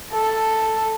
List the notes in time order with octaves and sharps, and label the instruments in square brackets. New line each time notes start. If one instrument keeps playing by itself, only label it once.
[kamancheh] A4